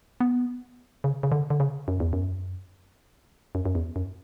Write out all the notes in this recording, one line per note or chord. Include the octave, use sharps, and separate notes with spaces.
B3
C#3
C#3
D3
D3
C#3
F#2
E2
F#2
F#2
F#2
E2
F#2